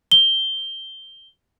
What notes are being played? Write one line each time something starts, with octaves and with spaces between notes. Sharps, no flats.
G7